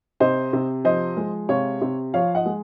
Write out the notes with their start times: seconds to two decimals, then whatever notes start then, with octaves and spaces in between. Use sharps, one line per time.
0.20 C3 C5 D#5
0.53 C3
0.84 F3 C5 D#5
1.17 G#3
1.49 C3 C#5 F5
1.82 C3
2.14 F3 C#5 F5
2.35 D#5 F#5
2.46 G#3